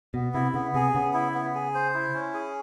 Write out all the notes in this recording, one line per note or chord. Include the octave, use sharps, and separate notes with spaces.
B2 B3
C3 E4
C#3 B3
C3 G#4
C#3 B3
E4
B3
G#4
C5
E4
C#4
G#4